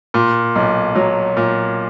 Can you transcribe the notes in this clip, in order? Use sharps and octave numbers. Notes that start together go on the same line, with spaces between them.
A#2
B1
F#3
A#2